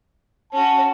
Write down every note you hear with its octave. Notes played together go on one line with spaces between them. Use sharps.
C#4 F#4 A5